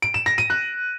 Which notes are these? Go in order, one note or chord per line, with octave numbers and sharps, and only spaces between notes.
D7
E7
A#6
D#7
F#6